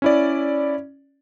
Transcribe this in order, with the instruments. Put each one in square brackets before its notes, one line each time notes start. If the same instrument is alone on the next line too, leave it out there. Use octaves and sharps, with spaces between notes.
[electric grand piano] C#4 E4 D5